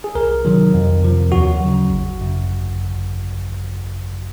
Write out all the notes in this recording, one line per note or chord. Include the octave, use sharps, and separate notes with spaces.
G#4
C2 A#4
C3 D#3 F#3
F2
C3 F3
D#2 F#4
C#3 F#3
G#1
F#2 C#3